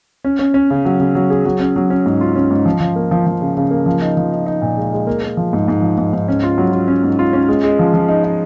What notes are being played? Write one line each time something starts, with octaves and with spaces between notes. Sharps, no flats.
C#4
C#4
C#4
C#3
F#3
C#3
F#3
G#4
F#3
C#4
F#3
C#4
G#2
F4
C#4
G#2
F3
F3
A#3
F3
F3
C#3
C#3
A#3
F3
D#4
F3
D#4
D#4
A#2
G#3
G#3
A#3
A#3
F3
G#2
G#2
F3
G#2
G#2
C#4
F4
F#3
F4
C#4
G#2
F4
C#4
G#3
G#3
F3
F3
D#4
D#4